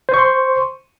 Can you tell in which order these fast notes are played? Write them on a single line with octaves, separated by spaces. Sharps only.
C5 C#6 C6